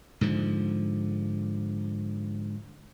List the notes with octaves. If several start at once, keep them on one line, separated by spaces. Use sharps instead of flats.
G#2 D3 F3